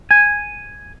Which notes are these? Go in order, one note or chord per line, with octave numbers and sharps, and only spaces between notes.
G#5